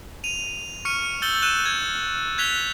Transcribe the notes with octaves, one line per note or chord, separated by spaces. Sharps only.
D#7 F7
C#6 F6 C#7 D#7
E6 G6 A6 C#7 F#7 G7
E6 F#6 D#7 E7 G7
G#6
F#6 G#6 B6 F7 G7